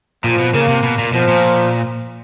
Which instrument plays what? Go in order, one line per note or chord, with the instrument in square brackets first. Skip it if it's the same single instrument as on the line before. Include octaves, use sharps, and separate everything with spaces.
[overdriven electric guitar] A#2 [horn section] F3
[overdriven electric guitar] B2
[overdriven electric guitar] C#3 [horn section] A#3
[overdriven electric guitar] C3
B2
A#2
[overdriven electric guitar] B2 [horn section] F3
[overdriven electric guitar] A#2